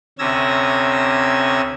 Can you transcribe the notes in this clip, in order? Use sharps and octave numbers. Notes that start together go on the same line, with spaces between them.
D2 C3 C#4 E6 G#6 A#6